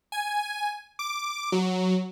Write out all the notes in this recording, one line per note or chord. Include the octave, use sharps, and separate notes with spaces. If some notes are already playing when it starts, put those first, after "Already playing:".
G#5
D6
F#3